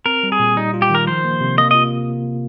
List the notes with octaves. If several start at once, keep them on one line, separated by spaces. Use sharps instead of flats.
C4 A#4
G3
G#4
A#2
G3 D#4
F4
G4
D#3 A#4
F3 C5
A#3
C3
A#3 D#5
F4 D#5